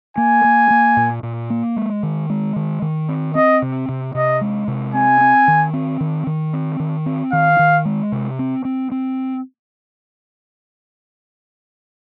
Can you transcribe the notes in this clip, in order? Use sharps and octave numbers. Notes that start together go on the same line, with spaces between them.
A#3 G#5
A#3
A#3
A#2
A#2
A#3
G#3
D#3
G#3
D#3
D#3
C4
C4 D#5
C3
C3
C3 D#5
G#3
C3
C4 G#5
C4
D#3
C4
D#3
D#3
C4
D#3
C4
D#3 F5
D#3
G#3
C3
C4
C4
C4